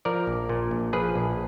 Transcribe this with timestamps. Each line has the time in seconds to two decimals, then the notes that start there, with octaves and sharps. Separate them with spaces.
0.05 F3 A#4 D5
0.27 A#1
0.49 A#2
0.71 A#1
0.93 F3 G#4 B4
1.16 A#1